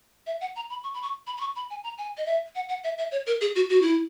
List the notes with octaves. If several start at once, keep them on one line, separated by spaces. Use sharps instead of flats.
E5
F#5
A#5
B5
C#6
B5
C#6
B5
B5
C#6
B5
G#5
A#5
G#5
D#5
E5
F#5
F#5
E5
E5
C#5
A#4
G#4
F#4
F#4
E4